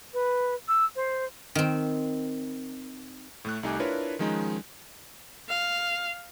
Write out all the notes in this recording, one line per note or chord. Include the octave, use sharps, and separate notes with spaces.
B4
E6
C5
D#3 C4
A2 A3 F#6
C2 A3 D#4 G4 G#5 D6
D4 E4 F4 A#4 B4 C#5
D#3 F3 G#3 C#4 D#4
F5